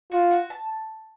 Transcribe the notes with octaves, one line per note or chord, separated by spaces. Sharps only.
F4 F#4
F#4
A5